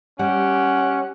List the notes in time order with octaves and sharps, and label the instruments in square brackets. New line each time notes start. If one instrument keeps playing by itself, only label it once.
[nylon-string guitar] G3 [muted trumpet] C#4 [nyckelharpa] G4 [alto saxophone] F#5